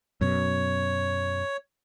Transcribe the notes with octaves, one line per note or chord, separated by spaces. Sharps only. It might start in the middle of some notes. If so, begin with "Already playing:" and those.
F#2 B2 C#5